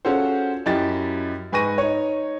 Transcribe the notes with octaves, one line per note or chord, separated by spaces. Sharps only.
C#4 F4 F#4 G#4 A4 C5
F#2 E4 G4 D#5 A6
G#2 B4 G#5 C#6 A#6 D#7
D#4 C#5